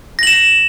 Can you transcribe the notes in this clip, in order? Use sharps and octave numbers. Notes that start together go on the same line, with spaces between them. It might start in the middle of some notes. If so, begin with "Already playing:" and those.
A#6 E7 F#7